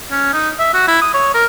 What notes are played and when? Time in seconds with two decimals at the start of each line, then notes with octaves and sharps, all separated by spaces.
0.11 C#4
0.33 D#4
0.59 E5
0.74 F#4
0.88 E4
1.02 D#6
1.14 C#5
1.34 A#4